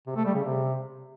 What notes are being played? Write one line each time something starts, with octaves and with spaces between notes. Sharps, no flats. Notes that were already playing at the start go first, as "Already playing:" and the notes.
C3
A3
G3
C#3
C3